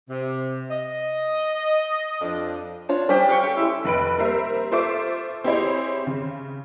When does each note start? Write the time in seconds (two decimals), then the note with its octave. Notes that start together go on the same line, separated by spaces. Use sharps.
0.10 C3
0.71 D#5
2.21 F2 F3 D4
2.89 D4 F4 C#5
3.09 G3 C#4 D4 G4 C5 G5
3.29 F5 G5 C#6
3.44 G4 A4
3.56 G#3 E4
3.85 F1 B4 D7
4.18 G3 A#3 A#4 C5 E5
4.71 F4 A4 C5 E5 C#6 D6
5.44 C4 E4 G4 G#4 C#5
6.07 C#3